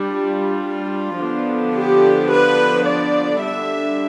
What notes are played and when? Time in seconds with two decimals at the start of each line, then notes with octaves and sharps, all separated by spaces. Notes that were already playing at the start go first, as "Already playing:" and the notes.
Already playing: G3 D4
0.08 F4
1.20 D3 F3 B3 D4
1.75 G4
2.31 B4
2.86 D5
3.43 D3 G3 D4 E5